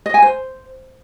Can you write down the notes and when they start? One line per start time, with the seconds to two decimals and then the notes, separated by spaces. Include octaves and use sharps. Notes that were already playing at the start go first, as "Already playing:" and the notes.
0.06 D#5
0.14 G#5
0.22 C5